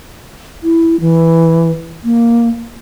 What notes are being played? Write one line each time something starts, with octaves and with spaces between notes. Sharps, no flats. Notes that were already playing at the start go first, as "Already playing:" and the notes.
E4
E3
A#3